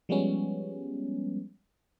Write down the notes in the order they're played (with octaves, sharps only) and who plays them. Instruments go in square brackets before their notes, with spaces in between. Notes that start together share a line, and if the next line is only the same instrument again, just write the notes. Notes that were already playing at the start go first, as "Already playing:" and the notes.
[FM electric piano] F3 G3 G#3 B3 C#4